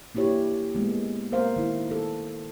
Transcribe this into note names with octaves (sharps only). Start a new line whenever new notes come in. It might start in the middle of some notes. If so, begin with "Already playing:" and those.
A#3 D4 E4 G4 C#5
G#3 A#3 B3
A#3 A#4 C5 F5
D#3 E4
A4